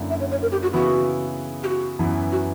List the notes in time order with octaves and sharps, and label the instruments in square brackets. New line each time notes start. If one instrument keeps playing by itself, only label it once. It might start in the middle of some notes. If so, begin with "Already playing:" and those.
Already playing: [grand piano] F#2 D3 A#3 E4
[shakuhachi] E5
C#5
C#5
A#4
G4
F#4
[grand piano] C#3 E3 B3 E4 [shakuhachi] F#4
[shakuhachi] G4
F#4
[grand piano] F#2 E3 B3 E4
[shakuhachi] F#4